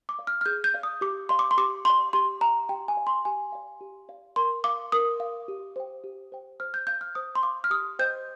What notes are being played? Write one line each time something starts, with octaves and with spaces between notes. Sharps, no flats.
D6
D5 F5
F6
F6
G#4 G6
G6
D5 F5
D#6
G4 D6
D5 F5 C6
D6
C6
G4 D6
D5 F5 C6
G4 C6
D5 F5 A#5
G4 G5
G#5
D5 F5
C6
G4 G#5
D5 F5
G4
D5 F5
A#4 C6
F5 D6
A#4 D#6
F5
G4
C5 G5
G4
C5 G5
C5 F6
G6
F5 G6
F6
C5 D#6
C6
F5 D6
F6
G4 D#6
C5 D#5 G5 G6